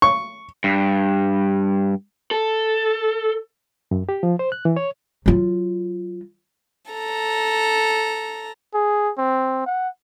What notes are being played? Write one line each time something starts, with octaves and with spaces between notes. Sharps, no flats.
C#6
G2
A4
F#2
G4
F3
C5
F#6
E3
C#5
F#3 F4
A4 A#5
G#4
C4
F#5